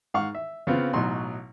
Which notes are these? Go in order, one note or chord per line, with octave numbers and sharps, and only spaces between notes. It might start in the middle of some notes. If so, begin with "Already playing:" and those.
G#2 F5 F#5 C#6
E5
C#3 B3 C4 F4
A1 B2 F#3 D#4 C6